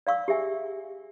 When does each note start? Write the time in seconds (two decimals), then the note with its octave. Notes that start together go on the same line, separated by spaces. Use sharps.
0.07 D5 F5 C#6 E6
0.28 G4 G#4 E5 G#5